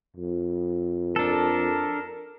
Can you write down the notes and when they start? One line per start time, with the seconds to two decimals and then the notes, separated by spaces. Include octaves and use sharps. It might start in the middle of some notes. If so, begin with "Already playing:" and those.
0.17 F2
1.16 D4 A4 A#4